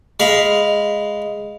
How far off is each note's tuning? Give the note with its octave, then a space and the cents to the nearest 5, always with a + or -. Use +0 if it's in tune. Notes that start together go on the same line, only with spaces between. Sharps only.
G#3 +0 F5 +0 B5 +0